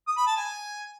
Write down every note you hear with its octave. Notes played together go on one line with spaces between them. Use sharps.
D#6
B5
A5
G#5